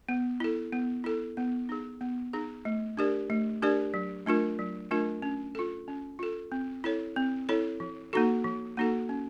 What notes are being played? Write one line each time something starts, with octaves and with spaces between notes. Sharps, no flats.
B3
E4 A4
B3
E4 A4
B3
D#4 G#4
B3
D#4 G#4
A3
D4 G4 A#4 D5
A3
D4 G4 A#4 D5
F#3
A3 D4 F4 A#4
F#3
A3 D4 F4 A#4
C#4
F4 A4
C#4
F4 A4
C4
E4 A4 C#5
C4
E4 A4 C#5
F3
A#3 D#4 F#4 A4
F3
A#3 D#4 F#4 A4
C#4